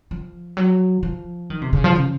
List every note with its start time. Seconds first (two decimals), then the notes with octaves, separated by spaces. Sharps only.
0.11 F3
0.57 F#3
1.03 F3
1.50 D#3
1.62 C3
1.73 C#3
1.84 F3
1.96 C#3